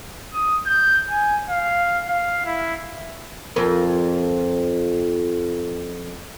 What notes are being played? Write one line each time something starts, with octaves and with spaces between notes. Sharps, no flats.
D#6
G6
G#5
F5
F5
E4
F2 A#4